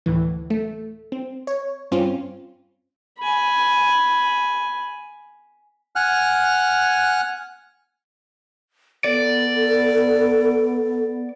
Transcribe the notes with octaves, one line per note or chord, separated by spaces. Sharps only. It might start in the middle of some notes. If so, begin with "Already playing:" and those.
D2 A2 E3
A3
C4
C#5
G2 C4 C#4 F4
G#5 B5
F#5 G#5 F6 F#6
B3 A4 D5